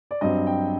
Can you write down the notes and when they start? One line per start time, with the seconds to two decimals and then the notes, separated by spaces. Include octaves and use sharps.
0.11 D5
0.21 G2 F#3 C4 D#5
0.47 G5